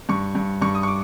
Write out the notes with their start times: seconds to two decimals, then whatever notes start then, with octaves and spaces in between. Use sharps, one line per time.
0.09 G2 C#6
0.35 G2
0.62 G2 C#6
0.75 D#6
0.83 C#6
0.88 D6